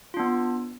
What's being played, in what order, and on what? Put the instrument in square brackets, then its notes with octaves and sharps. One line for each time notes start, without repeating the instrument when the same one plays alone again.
[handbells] F4
D4
B3